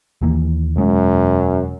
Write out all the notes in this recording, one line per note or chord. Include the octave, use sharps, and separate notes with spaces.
D#2 E3 A#3
E1 F#2 G#3 C#4